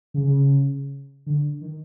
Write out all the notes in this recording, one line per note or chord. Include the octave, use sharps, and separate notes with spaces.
C#3
C#3
D3
D#3